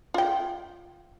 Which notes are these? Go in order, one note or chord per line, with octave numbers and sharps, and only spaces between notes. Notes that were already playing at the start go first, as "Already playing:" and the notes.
F4 G5